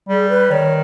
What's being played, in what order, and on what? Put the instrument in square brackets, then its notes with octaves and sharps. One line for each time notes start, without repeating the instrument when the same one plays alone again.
[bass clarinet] G3 [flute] G#4
[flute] B4
[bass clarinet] D#3 [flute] C#5